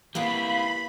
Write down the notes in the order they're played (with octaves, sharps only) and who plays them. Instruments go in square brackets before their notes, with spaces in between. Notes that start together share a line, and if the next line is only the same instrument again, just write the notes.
[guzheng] A#3 B3 [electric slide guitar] E4 G4 [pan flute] F5 [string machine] B5